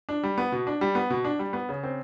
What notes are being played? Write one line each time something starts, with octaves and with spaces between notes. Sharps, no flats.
D4
G3
B3
B2
D4
G3
B3
B2
D4
G3
B3
C#3
C4